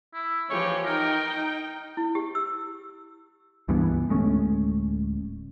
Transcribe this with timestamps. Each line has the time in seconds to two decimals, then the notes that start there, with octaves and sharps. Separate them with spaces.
0.14 E4
0.49 E3 F3 G4 C#5
0.85 D#4 A#4 G5
1.97 E4
2.15 G4
2.35 E6
3.68 C#2 G2 E3 B3
4.09 D1 G#3 A3 C#4